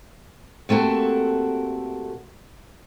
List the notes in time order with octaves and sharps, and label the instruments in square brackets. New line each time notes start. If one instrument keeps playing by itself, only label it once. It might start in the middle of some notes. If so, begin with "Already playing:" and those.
[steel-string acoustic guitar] C3 A3 A#3 F#4 A4